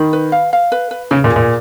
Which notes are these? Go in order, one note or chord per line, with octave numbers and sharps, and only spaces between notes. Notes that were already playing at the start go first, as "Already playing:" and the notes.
Already playing: D#3 B5
B4
F5
F5
B4
B4
C#3 G#4
A#2
G#4
A#2